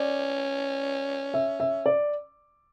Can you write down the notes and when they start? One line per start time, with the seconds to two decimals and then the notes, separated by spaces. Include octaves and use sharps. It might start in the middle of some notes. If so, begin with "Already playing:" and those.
Already playing: C#4 D5
1.34 E5
1.60 E5
1.86 D5